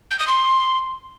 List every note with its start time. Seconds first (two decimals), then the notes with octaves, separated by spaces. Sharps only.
0.11 G6
0.19 D#6
0.27 C6